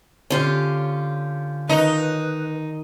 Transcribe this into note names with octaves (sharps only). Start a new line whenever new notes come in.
D3 C#4 F4 G4
D#3 D#4 B4